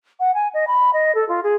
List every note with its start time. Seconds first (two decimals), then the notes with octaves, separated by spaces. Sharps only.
0.20 F#5
0.35 G#5
0.54 D#5
0.67 B5
0.93 D#5
1.15 A4
1.29 F4
1.44 G#4